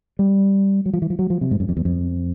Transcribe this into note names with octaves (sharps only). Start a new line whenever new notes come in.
G3
F#3
F3
E3
F3
F#3
F3
C3
G#2
F#2
F2
E2
F2